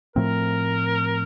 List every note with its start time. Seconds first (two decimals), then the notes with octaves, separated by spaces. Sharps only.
0.16 A2 F3 A3 C4 A#4